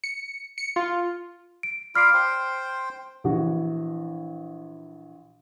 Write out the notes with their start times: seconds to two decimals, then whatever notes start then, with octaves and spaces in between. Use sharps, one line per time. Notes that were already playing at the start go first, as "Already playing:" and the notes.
0.04 C#7
0.58 C#7
0.76 F4
1.63 D7
1.95 F4 D5 B5 F6 C7 D7
2.14 C5 G5 C6
3.24 A#1 E3 F#4